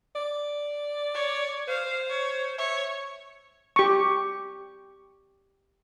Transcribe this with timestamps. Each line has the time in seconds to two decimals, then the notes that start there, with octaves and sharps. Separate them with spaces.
0.16 D5
1.14 C#5
1.68 C5 F5
2.09 C#5
2.58 C#5 E5
3.76 G4 C#6